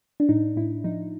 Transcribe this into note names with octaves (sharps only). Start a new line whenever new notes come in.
D4
A2 D#4
A2 E4
F3 D#4